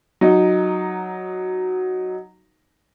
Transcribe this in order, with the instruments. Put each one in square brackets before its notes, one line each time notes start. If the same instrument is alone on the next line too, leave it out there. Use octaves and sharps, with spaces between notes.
[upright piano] F#3 D#4